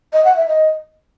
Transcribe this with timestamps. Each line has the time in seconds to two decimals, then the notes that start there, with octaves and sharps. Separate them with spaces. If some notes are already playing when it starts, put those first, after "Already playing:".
0.13 D#5
0.25 F#5
0.36 E5
0.48 D#5